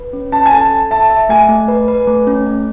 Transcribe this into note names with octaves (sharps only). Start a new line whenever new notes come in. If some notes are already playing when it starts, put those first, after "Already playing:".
Already playing: B4
C#4
C#4 A5
G#5
A4 A5
A4
E5 A5
E5
A3 G#5
A3
B4
B4
A3
C#4
A3